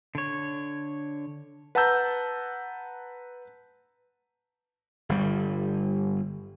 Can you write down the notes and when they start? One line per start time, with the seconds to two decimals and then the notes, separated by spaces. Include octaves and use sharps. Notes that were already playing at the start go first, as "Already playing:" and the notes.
0.15 D3 C#5
1.75 B4 F#5 A5 A#5 E6 G6
5.09 G1 G3